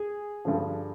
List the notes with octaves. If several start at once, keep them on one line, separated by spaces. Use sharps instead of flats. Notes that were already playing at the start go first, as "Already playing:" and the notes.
Already playing: G#4
G2 D3 F3